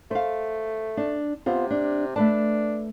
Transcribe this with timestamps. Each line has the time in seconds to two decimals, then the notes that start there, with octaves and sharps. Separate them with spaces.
0.11 A3 C5 F5
0.97 D4
1.46 C3 B3 C4 F4
1.70 D4
2.16 A3 D4 B4 A5